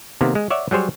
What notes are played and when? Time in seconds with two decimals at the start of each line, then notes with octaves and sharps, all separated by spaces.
0.21 C3 D#3 A#3 B3
0.35 G#3
0.50 C#5 D5 E5 F#5
0.71 F#3 G3 G#4 C5 C#5